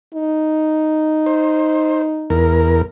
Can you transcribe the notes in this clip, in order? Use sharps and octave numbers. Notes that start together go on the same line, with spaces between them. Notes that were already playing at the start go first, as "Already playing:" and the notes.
D#4
C5
E2 A#4